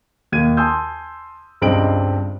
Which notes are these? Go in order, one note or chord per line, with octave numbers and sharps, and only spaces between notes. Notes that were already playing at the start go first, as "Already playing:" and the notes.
D#2 G#6 D#7
G#5 A5 C6 D#6 E6 G6
C#2 G2 C4 D#5 D7 F#7